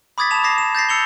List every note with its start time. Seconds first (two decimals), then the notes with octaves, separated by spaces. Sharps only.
0.18 B5 D6 D#6 G#6 A6 B6
0.31 A5 E7 F7
0.44 D6 D#6 A#6 C7
0.58 E7
0.75 G6 A6 A#6 C7
0.89 E6 C#7 F7 G7